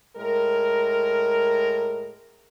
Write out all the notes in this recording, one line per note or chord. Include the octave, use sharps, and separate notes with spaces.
A2 G#3 A#4